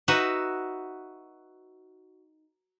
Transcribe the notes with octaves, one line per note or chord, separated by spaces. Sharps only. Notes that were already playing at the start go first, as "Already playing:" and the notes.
D#4 F#4 B4 D#5 E5